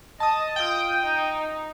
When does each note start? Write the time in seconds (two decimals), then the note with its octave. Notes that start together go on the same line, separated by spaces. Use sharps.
0.20 D#5 A5 D#6
0.56 F4 G5 D#6
1.03 D#4